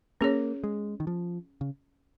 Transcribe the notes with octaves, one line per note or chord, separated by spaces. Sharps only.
A#3 C#4 G#4 C#5
G#3
D#3
F3
C#3